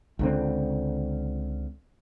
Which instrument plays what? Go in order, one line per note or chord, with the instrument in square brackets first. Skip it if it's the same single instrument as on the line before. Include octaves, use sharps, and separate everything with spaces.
[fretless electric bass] C#2 D3 C4